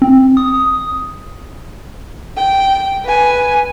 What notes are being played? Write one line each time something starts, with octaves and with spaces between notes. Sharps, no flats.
C4
D#6
G5
B4 G#5